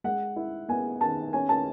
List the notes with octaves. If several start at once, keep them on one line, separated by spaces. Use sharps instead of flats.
G#3 F#5
E4
B3 G#5
D#3 A5
C#4 G#5
A5